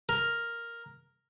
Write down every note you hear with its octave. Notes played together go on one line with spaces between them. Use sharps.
A#4